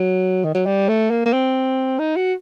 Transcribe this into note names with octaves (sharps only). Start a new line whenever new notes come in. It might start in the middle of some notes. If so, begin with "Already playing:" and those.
Already playing: F#3
D#3
F#3
G3
A3
A#3
A#3
C4
D#4
F#4